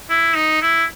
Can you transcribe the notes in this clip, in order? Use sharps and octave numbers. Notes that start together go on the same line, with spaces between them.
E4
D#4
E4